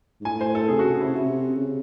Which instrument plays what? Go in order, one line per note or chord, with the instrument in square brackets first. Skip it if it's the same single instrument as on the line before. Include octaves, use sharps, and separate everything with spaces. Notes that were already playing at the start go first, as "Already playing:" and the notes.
[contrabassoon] G#2
[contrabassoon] A2 [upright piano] G#5
[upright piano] C5
A4
[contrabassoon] C3 [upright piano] G#4
[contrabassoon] C#3 [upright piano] F#4
[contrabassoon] C3
[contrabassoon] C#3 [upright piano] E4
[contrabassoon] C3
C#3
C3
C#3